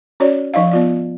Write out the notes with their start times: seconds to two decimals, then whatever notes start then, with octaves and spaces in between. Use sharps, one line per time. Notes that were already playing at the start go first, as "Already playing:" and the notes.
0.20 C#4 F#4 C#5 D5
0.54 F3 D#4 D#5 F5
0.71 B3 F4 D5